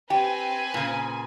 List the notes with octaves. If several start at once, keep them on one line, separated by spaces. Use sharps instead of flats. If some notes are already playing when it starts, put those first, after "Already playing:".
C4 G4 B4 G5 G#5
A#2 C#3